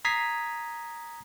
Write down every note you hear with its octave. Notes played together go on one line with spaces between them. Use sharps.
A#5 D#6 G#6 B6 C7